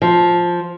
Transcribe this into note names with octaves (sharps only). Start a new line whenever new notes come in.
F3